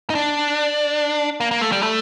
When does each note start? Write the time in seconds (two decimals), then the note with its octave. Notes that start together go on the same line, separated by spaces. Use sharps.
0.10 D#4
0.15 D4
1.40 A#3
1.51 A#3
1.61 A3
1.72 G3
1.83 A3